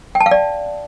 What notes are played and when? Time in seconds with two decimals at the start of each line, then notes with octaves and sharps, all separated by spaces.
0.15 G5
0.21 A5
0.26 F5
0.31 D5